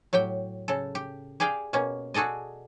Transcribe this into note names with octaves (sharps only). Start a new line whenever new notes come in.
A2 F#3 G4 G5
C#3 A4
G4
G4 G#4 D5 F5 G5
B2 A#3 C#4
F#4 G#4 A4 D5 D#5